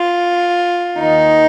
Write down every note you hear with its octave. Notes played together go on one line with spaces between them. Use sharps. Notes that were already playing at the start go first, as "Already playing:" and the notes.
Already playing: F4
D#2 D#3 D#4